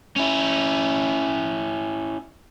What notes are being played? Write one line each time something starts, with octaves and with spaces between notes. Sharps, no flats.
C#4 E4